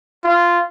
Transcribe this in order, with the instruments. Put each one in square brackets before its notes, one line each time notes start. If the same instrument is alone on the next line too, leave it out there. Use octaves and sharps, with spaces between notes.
[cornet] F4